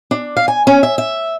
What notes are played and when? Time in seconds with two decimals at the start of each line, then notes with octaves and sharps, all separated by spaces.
0.11 D4
0.37 F5
0.48 G#5
0.67 C#4
0.83 E5
0.98 E5